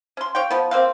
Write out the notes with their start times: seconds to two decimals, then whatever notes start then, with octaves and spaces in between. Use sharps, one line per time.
0.17 C#4 C6
0.35 C#5 F5 G5
0.51 F3 B3
0.71 A#3 C4 F5